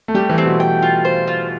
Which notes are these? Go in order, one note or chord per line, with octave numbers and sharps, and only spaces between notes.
A3
G3 G4
E3
C4
B2
G5
F4
C5
F4